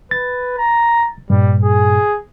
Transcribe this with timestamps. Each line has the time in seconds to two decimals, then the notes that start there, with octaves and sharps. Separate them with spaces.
0.11 B4 A6
0.58 A#5
1.30 G2 A#2 G3
1.63 G#4